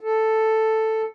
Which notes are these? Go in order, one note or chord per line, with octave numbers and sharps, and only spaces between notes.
A4